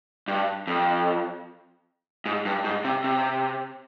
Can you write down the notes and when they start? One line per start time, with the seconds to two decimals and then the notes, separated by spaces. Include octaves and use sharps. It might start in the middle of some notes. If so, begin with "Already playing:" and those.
0.28 G2
0.67 F2
2.26 G#2
2.45 G2
2.64 G#2
2.84 C3
3.04 C3